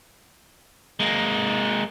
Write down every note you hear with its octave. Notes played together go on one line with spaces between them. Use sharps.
G#3 A#3